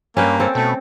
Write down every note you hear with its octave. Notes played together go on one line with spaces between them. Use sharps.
G2 A#3 C#4 B4 G5
C4 C#4 A4
B2 A3